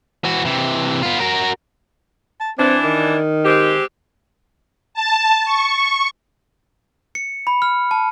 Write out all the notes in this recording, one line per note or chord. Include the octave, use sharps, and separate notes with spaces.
E3 F#4
C3 E3
B3 F4
F#4 A#4
A5
E3 C4 D4
D#3
G#3 C4 G4
A5
C#6
C#7
B5
F6
A5